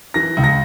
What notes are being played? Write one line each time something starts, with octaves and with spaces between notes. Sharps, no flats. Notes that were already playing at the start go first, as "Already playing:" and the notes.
E3 A#6
C#2
A#6